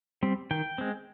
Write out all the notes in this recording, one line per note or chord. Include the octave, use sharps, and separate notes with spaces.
G3 C4
D#3 G5
G#3 C4